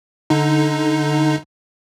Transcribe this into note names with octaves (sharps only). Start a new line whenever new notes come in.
D3 D#4